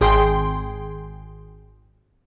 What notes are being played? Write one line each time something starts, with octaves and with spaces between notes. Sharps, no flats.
G#1 G#4 G5 C6